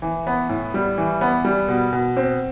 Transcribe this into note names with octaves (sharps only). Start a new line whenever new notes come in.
E3
B3
A2
G3
E3
B3
G3
B2
B2
C4